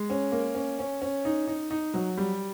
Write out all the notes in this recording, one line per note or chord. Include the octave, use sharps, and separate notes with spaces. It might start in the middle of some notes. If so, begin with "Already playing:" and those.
Already playing: G#3
C#4
A#3
C#4
C#4
C#4
D#4
D#4
D#4
F#3
G3